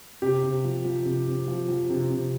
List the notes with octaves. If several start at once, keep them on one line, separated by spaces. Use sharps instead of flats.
C3 G4
C3
F3
F3
C3
C3
F3
F3
C3
C3